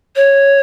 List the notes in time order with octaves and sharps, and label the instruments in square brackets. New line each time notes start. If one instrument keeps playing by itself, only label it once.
[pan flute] C#5